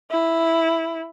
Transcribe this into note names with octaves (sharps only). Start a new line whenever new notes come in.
E4